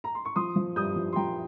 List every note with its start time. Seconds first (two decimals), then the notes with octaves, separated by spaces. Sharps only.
0.04 A#5
0.15 C6
0.25 C#6
0.36 F3 C6 D#6
0.56 F3
0.76 G2 D#6 G6
0.96 F3
1.13 C6
1.16 F3 G5 A#5